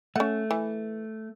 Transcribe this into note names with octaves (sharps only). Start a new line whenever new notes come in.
A3 C#4 F#5
E3